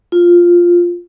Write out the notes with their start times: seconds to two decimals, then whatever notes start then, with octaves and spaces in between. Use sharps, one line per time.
0.12 F4